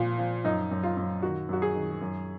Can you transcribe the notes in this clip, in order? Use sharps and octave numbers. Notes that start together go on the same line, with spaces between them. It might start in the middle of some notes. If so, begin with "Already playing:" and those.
Already playing: A#2 F3
F3
F#2 D#4
F#2
F4
F#2
D#3 F#4
F#2 F#4
G#4
D#3
F#2